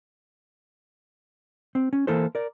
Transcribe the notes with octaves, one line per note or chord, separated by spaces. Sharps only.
C4
C#4
E3 A#3 E4 A4 C5
A#4 D5